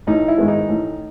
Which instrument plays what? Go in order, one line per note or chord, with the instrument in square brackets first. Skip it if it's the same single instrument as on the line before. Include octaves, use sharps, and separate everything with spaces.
[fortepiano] A1 D#4
E4
G#2 D#3 G#3 B3
D#4
A1